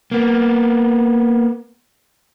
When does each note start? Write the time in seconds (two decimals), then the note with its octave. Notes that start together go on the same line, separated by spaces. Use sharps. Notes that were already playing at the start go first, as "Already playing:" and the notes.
0.12 A#3 B3